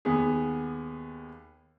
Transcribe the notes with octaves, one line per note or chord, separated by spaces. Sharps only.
D#2 B3 G#4